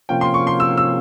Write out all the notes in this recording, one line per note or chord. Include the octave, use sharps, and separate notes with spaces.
C3 F3 A#3 C#4 F4 G5
C6
C#6
C6
E6
E6